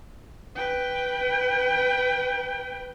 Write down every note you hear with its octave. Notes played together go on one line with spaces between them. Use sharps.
B4 G5